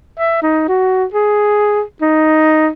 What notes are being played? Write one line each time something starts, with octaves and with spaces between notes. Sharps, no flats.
E5
D#4
F#4
G#4
D#4